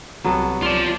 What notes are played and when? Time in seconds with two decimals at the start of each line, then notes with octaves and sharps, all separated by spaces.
0.24 C2 F#3 B3 G4 A4
0.63 F4 D5 A5